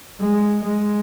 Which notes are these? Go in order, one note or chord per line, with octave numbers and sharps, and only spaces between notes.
G#3
G#3